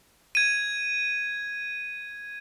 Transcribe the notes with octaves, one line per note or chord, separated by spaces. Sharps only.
G#6 D#7